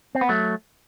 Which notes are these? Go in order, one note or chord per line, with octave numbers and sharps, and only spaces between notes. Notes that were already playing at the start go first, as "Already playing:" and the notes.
C4
B3
F#3 A3